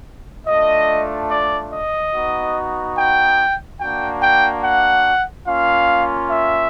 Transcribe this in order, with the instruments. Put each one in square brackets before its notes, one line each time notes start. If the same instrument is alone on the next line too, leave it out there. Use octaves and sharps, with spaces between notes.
[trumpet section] A3 D4 F4 D#5
D5
D#5
B3 D#4 F#4
G5
A#3 D4 F#4 G5
G5
F#5
A#3 C#4 F4 F5
E5